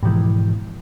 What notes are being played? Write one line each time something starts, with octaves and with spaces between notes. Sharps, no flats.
G#2 B2 E3 F3